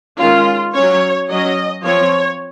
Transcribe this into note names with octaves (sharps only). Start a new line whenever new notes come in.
D#3 G#3 C#4 F4
F#3 C#4 C#5
F#3 C#4 D#5
F3 C4 C#5